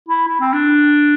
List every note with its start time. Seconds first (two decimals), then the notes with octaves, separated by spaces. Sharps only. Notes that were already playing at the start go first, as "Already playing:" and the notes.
0.08 E4
0.28 E4
0.40 C4
0.53 D4